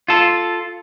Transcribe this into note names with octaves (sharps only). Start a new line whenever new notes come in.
F4 A4